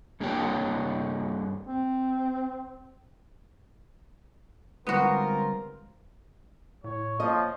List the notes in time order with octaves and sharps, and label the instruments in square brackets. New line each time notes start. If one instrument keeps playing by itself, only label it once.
[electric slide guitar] G2 A#3 D4 G4 C#5 G5
[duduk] C4
[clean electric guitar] D3 G3 G#3 [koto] B3 F#4 [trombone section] C4 F4 A#4
[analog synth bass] A2 [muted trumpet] C#5
[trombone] F3 [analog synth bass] A#3 [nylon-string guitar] D#5